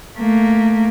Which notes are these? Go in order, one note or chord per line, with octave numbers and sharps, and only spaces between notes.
A3 A#3